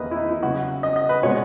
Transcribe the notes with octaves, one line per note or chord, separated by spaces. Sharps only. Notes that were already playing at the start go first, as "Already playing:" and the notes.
Already playing: E2 D#3 A#3 B4 D#5
E4
D#4
E4
C#3 F#3 B3 F#4
D#5
D#5
B4
B2 G#3 B3 C#5